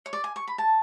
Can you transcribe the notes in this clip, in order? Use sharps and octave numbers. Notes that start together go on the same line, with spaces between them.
C#5
D5
G#5
C#6
B5
A5